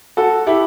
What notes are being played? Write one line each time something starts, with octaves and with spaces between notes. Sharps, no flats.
F#4 A4
E4 G4